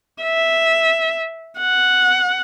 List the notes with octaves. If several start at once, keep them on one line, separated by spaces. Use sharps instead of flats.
E5
F#5